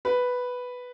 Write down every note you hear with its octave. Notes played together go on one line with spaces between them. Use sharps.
B4